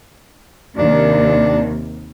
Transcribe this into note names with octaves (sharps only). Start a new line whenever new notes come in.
D#2 C3 D#3 D4